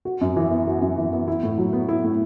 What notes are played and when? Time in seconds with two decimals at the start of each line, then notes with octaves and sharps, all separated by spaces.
0.05 F#4
0.21 F#2
0.36 E3
0.51 B3
0.67 F#4
0.82 F#2
0.98 E3
1.13 B3
1.28 E4
1.43 A2
1.58 F#3
1.73 B3
1.88 E4
2.04 A2